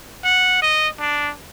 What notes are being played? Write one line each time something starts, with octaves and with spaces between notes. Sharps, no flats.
F#5
D#5
D4